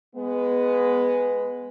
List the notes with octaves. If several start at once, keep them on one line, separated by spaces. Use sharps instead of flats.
G#3 B3